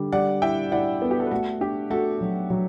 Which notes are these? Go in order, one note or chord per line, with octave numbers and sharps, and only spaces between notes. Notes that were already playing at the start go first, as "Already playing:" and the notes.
Already playing: D3 G3
G3 D5 F#5
E4 E5 G5
E4 D5 F#5
B3 A4
G4
F#4 A4
B4
A3 F#4 A4
D4 G4
A3 F#4 A4
F#3
F#3